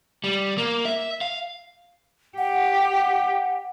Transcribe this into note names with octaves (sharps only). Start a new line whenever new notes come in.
G3
A#3
E5
F5
G4 F#5